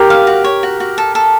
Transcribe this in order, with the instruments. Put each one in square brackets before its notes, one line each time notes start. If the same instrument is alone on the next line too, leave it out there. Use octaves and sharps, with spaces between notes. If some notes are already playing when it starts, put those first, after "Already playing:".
Already playing: [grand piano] G4 A#4 [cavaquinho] C6
[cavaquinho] F5
F#4
C#5
F#4
F#4
A4
A4